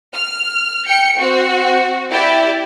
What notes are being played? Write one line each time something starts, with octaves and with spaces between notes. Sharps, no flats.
F6
G5 C#7
C4 F#4
E4 G4 D5